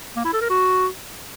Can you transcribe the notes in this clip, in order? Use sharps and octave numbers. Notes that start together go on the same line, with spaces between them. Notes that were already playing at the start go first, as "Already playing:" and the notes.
A#3
E4
A4
A#4
F#4